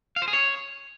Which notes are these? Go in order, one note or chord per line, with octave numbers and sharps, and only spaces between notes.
F5
C5
G#4
C#5